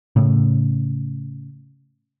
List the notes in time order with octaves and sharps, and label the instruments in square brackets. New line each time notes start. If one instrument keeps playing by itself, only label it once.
[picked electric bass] A2 C#3